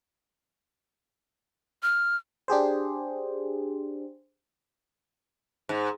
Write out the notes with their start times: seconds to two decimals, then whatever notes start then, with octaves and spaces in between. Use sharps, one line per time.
1.83 F6
2.48 D4 G4 G#4 C5
5.69 G#2